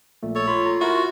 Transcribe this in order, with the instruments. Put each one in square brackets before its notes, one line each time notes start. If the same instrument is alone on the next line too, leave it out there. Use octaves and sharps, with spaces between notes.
[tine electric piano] A#1 A#2 A3
[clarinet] A4 [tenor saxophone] C#5
[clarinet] F4 [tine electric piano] B5
[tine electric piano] A#5
[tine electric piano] E4 A#4 [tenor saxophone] F#4